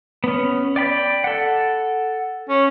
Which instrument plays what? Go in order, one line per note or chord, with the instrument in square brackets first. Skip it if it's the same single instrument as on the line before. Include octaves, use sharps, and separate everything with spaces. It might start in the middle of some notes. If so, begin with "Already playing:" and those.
[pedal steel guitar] B3 C#4
D5 G5 B5
A4 F#5
[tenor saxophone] C#4